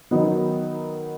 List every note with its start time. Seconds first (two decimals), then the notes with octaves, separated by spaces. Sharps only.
0.11 D#3 F#3 B3 D#4